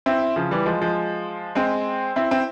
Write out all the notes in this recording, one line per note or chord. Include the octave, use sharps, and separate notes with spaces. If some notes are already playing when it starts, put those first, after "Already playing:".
C4 E4
C#3 F3
E3 G3
F3 G#3
F3 G#3
G#3 C4
C4 E4
C4 E4